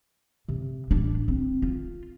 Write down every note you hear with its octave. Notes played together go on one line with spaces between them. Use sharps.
C3
A1 D4
C4
F4